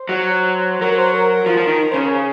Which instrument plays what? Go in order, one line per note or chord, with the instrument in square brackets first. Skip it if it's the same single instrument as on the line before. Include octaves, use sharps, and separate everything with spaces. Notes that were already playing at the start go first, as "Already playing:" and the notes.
Already playing: [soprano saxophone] C5
[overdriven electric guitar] F#3
[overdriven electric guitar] F#3 [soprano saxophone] A#4
[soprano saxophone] A#4
C5
A#4
[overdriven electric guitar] F3
F3
D#3
[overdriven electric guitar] C#3 [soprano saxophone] C5
[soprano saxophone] A#4
G#4